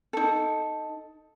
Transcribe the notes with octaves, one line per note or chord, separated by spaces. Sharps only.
D#4 A4